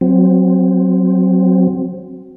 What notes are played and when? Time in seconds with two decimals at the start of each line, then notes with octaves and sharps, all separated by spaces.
0.01 F#3 C4